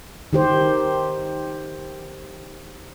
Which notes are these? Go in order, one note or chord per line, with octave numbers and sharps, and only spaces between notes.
D#3 G4 C5